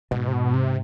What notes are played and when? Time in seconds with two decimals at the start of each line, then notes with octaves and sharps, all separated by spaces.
0.11 G#2 B2
0.28 C3
0.33 B2
0.54 C3